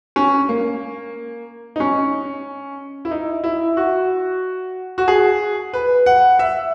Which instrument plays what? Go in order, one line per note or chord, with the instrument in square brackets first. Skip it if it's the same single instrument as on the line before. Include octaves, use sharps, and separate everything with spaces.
[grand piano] C#4
A#3
D#4
C#4
E4
D#4
E4
F#4
F#4
G#4
B4
F#5
E5